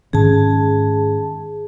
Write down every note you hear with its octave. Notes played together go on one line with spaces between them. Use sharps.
G#2 D#3 C#4 G#4 A5